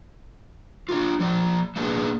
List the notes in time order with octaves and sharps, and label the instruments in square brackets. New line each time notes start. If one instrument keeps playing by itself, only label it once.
[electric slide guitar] D4 F4
F3 D5
A#3 B3 D4 G#4